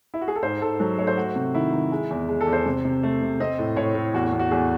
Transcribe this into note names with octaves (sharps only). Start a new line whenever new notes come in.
E4
F#4
G#4
A4
G#2 C5
G#2 A4
F#3 A4
A3 C#5
C5
A3 F#4
C3
D#3 E4
D#3
G#3
E2
G#3
A4
E2
C5
C3
C3
A3
C3
C4 D#5
A2
A2 C#5
A2
E2 F#4
F#4
E2
F#4
E2 G#4